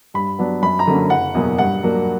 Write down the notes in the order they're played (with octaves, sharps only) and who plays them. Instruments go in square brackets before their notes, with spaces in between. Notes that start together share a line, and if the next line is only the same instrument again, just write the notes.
[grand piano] G2 B5
F#3 B3 D4
F#2 B5
A#5
D3 F#3 A#3 C#4
F#1 F#5
E2 B2 F#3 A#3
G2 F#5
F#3 A#3 D4